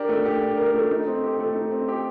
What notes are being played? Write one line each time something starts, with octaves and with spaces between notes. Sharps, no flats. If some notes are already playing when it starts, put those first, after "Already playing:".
Already playing: D4 G4 A#4
A3
G4
D4
A#4
A3
D#4
C4
G4
A3
D#4
C4
G4